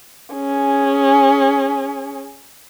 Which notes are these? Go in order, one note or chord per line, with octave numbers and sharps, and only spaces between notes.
C#4 G#4